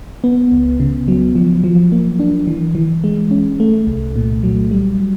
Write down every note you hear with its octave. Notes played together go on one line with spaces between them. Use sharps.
B3
C#2
C#3
F#3
F3
F3
A#3
D4
E3
E3
G#3
C#4
A3
C2
A#2
F#3
G3